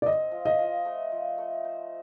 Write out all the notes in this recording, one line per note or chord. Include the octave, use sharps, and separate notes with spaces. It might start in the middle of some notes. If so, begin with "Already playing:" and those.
D5
C4 D#5
F3
D#5
F3
A3
F3
A3
C5